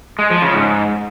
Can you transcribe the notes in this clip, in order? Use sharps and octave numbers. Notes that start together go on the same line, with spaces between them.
G#3
F3
C#3
G#2